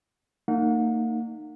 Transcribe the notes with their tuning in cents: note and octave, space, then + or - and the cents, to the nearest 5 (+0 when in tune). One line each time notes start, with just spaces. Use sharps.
A#3 -35 D#4 -25 F#5 -40